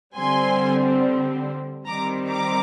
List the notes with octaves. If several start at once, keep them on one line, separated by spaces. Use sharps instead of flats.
D3 G3 C4 G#5 C6
D#3 G3 C4 A#5 D6
A#5 D6